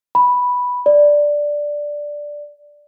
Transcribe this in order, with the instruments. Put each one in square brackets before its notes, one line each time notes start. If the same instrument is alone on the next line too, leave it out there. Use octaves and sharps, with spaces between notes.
[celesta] B5
D5